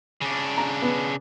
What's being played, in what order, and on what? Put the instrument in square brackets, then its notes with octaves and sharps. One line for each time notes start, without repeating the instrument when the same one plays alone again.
[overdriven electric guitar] C#3 D4
[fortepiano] A#5
B3